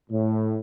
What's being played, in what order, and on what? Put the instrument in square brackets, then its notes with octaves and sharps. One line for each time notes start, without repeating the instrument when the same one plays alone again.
[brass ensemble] A2